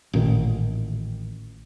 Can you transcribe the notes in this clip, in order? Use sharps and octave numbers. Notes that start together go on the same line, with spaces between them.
A1 A#2 D#3